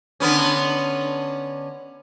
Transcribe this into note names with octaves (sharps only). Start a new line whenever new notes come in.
D3 B3 C#4